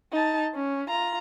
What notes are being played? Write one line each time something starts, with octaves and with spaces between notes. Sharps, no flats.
D#4 A5
C#4
F4 A#5